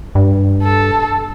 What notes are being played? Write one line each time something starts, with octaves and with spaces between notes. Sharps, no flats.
G2
A4